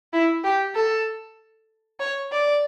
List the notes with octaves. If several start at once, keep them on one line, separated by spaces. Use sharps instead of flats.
E4
G4
A4
C#5
D5